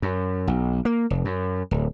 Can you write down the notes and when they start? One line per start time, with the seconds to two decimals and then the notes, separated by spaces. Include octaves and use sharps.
0.02 F#2
0.47 B1
0.85 A#3
1.10 F1
1.25 F#2
1.71 D1